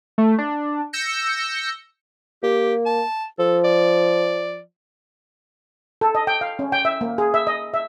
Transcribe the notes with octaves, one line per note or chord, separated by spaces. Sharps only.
A3
D4
E6 G6 A#6 C#7
A#3 G4
A5
F3 A4
D5
A4
D#5
G5
F5
C#4
G5
E5
A#3
G#4
E5
D#5
E5